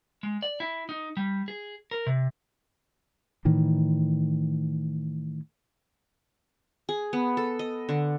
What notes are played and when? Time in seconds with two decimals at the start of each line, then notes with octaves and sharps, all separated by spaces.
0.23 G#3
0.42 D5
0.60 E4
0.89 D#4
1.17 G3
1.48 G#4
1.91 A#4
2.07 C3
3.45 A2 D#3 E3
6.89 G#4
7.13 B3
7.37 A4
7.59 D#5
7.89 D3